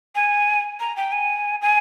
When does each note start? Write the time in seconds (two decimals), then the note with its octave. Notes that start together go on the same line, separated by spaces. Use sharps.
0.15 G#5
0.80 A#5
0.96 G5
1.12 G#5
1.62 G#5